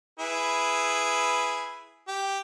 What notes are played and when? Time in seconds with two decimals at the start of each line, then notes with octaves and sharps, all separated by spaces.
0.19 E4 G#4 B4
2.08 G4